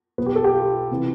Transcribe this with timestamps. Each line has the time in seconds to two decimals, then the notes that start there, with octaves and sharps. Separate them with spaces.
0.18 B1 B2 B3
0.26 G4
0.35 A4
0.44 G4
0.54 F4
0.91 C3 E3